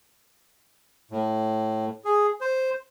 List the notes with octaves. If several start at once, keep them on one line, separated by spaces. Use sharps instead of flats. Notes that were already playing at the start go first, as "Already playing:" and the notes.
A2
G#4
C5